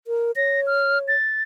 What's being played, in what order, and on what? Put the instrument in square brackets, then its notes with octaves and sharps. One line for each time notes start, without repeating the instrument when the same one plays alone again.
[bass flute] A#4
[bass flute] C#5 [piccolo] A#6
[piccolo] F6
A6